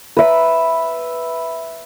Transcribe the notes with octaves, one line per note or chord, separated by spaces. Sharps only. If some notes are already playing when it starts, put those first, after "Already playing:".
B4 E5